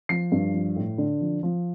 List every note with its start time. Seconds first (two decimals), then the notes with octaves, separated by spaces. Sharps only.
0.09 F3 C7
0.32 G2
0.54 F3
0.76 A2
0.98 D3
1.20 F3
1.43 F3